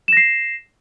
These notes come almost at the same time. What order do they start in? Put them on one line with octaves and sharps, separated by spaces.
E7 A#6 C7